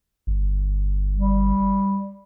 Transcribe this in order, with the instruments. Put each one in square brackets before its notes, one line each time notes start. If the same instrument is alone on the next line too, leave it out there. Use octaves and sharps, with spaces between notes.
[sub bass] G1
[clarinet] G3